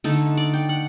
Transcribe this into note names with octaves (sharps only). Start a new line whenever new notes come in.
D3 A3 D#4 A4
D5
G5
F#5